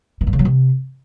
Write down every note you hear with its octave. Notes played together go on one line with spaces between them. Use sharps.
D#3
G2
C#3
F#3
C3